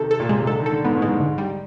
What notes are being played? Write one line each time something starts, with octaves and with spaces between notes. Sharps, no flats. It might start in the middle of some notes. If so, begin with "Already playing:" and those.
Already playing: C3 D#3 A4
A4
A#2
C3 G#3
C3
D3 A4
D#3
A4
D3
G#2 B3
A2
G#3
G#2
D3
G3